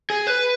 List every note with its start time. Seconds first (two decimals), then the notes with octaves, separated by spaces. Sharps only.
0.10 G#4
0.27 B4